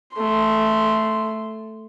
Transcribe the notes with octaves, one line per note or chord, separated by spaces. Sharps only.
A3 C6